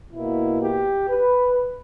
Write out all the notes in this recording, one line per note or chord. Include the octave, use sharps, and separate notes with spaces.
B2 A#3 E4
G4
B4